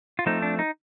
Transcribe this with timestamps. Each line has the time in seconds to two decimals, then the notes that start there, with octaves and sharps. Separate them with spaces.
0.19 F4
0.26 F3 A3 C4 D#4
0.42 D4
0.59 D#4